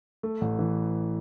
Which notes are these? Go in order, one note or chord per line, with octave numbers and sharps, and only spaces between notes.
A3
A1
E3